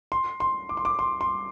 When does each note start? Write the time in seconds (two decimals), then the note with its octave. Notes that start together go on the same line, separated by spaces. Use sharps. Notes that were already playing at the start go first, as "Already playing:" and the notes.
0.12 C6
0.40 C6
0.69 D6
0.77 C6
0.85 D6
0.99 C6
1.21 C6